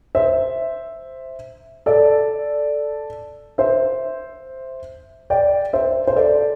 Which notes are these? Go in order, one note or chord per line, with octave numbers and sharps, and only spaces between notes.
C5 E5
A4 D5
C5 E5
D5 G5
C5 E5
C5
A4 D5